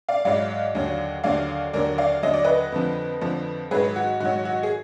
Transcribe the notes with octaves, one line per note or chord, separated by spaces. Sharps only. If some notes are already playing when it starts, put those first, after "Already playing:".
D5 F5
G#2 F#3 D5 F5
D#2 D3 F#3
D#2 D3 F#3 D5 F5
D#2 D3 F#3 A#4 D5
D5 F5
D#2 D3 F#3 D#5
D5
B4 D#5
F2 D3 F3
F2 D3 F3
G#2 D#3 F#3 G#4 B4
F#4
G#2 D#3 F#3 F#4
F#4
G#4